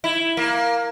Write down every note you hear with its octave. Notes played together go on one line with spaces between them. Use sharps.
E4
A#3